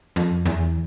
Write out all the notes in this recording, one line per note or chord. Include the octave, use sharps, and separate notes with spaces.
F2
E2